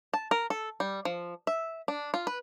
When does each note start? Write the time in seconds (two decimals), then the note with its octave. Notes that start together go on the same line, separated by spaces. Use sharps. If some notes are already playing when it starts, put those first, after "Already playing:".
0.13 A5
0.31 A#4
0.50 A4
0.80 G3
1.05 F3
1.47 E5
1.88 D4
2.14 F4
2.27 B4